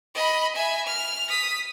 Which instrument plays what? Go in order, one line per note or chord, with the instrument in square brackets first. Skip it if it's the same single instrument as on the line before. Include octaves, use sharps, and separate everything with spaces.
[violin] D#5 B5
E5 G#5
F6
D#6 B6